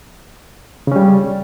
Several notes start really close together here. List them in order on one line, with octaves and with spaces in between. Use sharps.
C#3 C#4 G3